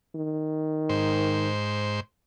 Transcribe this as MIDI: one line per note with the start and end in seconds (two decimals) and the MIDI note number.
0.15 1.50 51
0.89 2.00 44
0.89 2.00 72